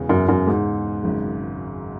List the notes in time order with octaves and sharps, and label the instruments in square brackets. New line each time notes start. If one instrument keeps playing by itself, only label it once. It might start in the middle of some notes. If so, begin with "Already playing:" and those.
Already playing: [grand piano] E1 E2 C#3
[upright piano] F#2
F#2
G#2
[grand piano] G#1 F#2 C#3